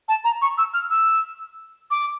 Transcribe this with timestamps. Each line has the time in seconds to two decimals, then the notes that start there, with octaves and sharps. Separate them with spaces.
0.08 A5
0.24 A#5
0.42 C#6
0.58 E6
0.74 F6
0.90 E6
1.91 D6